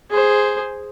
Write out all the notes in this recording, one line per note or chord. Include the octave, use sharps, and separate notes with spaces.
G#4 C5